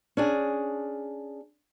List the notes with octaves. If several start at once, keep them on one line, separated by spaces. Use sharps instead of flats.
C#4 D4 G#4